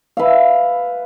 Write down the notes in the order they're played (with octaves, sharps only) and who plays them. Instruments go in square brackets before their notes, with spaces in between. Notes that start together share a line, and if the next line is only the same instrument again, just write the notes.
[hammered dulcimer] B4 E5 F5